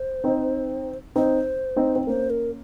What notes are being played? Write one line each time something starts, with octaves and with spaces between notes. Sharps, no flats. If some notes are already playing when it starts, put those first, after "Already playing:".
Already playing: C5
C4 D#4
C4 D#4 C5
C4 D#4
C4
A#3 C#4 C5
A#4